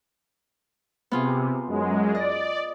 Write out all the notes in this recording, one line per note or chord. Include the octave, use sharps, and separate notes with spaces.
C3 B3 F4 G#4
F#2 G#3
D5 D#5